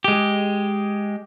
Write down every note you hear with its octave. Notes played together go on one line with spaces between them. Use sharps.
G#3 G4